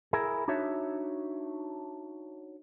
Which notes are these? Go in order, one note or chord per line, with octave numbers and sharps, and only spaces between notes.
E4 G#4 A#4
D4 D#4 F#4 C#5 E5